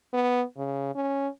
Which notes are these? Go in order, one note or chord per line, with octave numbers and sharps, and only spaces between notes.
B3
C#3
C#4